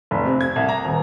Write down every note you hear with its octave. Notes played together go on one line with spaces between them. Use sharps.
F1
C3
G#6
C2
A#5
D#1